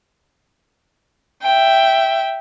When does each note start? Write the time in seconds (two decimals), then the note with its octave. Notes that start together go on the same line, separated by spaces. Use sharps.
1.43 E5 G5